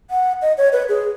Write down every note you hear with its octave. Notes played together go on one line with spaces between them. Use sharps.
F#5
D#5
C#5
B4
G#4